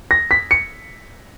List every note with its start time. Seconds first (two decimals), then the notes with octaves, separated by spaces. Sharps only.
0.11 A#6
0.31 B6
0.51 C#7